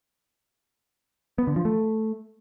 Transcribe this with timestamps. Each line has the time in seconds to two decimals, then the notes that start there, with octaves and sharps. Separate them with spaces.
1.38 B3
1.47 D3
1.56 F3
1.65 A3